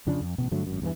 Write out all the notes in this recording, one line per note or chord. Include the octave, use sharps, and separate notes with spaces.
F2 C#3 F3 D4
F2
A1 B2
G2 D3 F#3 A3
G#1 F#2
E2 G2 B2 E3